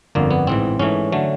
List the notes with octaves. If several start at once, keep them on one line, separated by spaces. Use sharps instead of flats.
G1 F2 D3 A#3
B3
A1 G#2 E3 C4
G#2 E3 A3 C#4
D3 F#3 A3